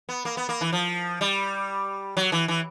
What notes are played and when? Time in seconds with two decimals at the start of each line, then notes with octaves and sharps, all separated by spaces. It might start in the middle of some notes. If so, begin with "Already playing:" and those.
0.09 B3
0.25 A#3
0.37 B3
0.49 A#3
0.61 E3
0.72 F3
1.21 G3
2.17 F#3
2.32 E3
2.48 E3